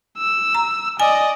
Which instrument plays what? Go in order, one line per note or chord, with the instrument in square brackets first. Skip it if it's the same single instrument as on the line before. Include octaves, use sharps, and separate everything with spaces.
[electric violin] E6
[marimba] A#5
[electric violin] D5 D#5 [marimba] G#5